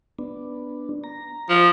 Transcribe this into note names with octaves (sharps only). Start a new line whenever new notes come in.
B3 D4
A#5
F3